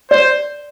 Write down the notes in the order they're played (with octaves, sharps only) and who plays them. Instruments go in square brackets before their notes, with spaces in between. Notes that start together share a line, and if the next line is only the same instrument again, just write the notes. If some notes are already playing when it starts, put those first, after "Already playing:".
[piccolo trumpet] C5 [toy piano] D5